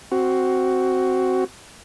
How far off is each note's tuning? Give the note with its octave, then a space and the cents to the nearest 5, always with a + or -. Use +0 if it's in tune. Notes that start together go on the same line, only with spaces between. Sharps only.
C4 +0 F#4 +10